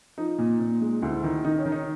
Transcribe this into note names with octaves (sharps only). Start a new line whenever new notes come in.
F3 D#4
A#2
A#2
G#3
D2 E4
D#3
D#3 D#4
C#4
D#3
D#4